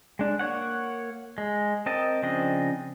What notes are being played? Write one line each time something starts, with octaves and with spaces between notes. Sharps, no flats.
G#3 D4
A#3 C#5 F#5
G#3
C4 A#4 D#5 A5
C#3 F3 C4 D4 D#5